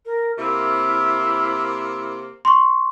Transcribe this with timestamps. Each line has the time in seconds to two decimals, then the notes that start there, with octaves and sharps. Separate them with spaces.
0.05 A#4
0.38 C3 A#3 E4
2.45 C6 C#6